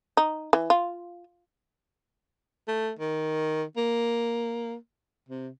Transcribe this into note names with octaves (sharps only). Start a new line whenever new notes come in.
D#4
E3
F4
A3
D#3
A#3
C3